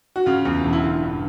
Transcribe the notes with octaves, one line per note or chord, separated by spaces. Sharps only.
F#4
C#3 F4
E2
E1
E4
D3 F4
G2